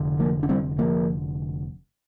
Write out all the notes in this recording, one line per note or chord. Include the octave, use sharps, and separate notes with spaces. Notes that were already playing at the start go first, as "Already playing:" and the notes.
Already playing: F1 D3
F3 A#3
D4
G3 C4
F3 A#3